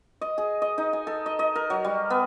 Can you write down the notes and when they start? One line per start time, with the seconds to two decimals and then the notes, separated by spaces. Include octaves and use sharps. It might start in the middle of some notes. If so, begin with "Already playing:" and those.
0.21 D#5
0.38 G#4
0.62 D#5
0.78 D#4
0.93 G#5
1.07 A4
1.26 D#5
1.39 D#5
1.55 A#4
1.70 F#3
1.85 G3
2.10 B3